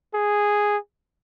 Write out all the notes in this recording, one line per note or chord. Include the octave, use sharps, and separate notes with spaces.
G#4